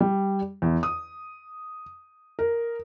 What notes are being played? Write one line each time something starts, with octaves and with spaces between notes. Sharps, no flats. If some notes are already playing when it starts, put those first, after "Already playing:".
G3
E2
D#6
A#4